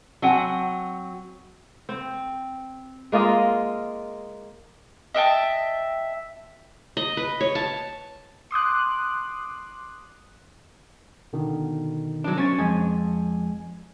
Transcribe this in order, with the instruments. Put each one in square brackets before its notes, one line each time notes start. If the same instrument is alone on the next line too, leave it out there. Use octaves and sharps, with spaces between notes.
[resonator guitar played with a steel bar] F#3 C4 F#5 G#5
[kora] C4
G#3 A#3 F4 D#5
[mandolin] D#5 E5 G5 A5
[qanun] D#5
B4
C#5
A5
[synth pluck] C6 D6 D#6 F#6
[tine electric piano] B2 D3 D#3
[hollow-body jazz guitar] F#3 D4
[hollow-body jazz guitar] C#4 [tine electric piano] C5 C#6 A6
[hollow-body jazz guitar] F2 [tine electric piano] G#3 G#5 G#6